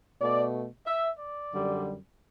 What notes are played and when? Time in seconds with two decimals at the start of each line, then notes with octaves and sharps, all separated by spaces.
0.21 B2 A3 D5
0.86 E5
1.19 D5
1.53 F#2 D3 G3